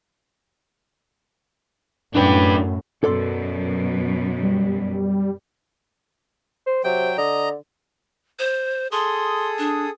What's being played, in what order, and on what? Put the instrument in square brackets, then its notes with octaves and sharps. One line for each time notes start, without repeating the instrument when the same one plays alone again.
[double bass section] F#2 A2 [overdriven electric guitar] D4 B4
[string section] F#2 B2 [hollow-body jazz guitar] A4 D5 C6
[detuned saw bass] G3
[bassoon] C5
[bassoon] C3 [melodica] F#3 G5
[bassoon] D3 [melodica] D#5 A#5
[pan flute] C5
[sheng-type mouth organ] G#4 A4 D#6 [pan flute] C6
[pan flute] D4